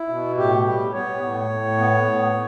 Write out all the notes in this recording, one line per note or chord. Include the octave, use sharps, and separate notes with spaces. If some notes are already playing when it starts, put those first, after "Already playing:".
Already playing: E4
B2
A2 G4
G3
B3 C#5
A2
A2
B3
A2